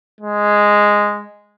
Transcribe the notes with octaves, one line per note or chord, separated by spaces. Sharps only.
G#3